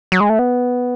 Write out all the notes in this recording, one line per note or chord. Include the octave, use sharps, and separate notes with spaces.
F#3
G#3
A3
B3